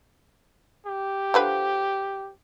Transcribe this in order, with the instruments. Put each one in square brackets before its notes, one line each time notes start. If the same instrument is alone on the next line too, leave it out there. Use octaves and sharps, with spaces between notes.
[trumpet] G4
[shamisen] D3 F3 B4